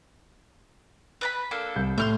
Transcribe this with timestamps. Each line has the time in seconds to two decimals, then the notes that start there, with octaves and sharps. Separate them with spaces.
1.21 B4 A#5 B5
1.51 A#3 D4 A4
1.76 C2 G6
1.98 A2 C6 F6 G6 F7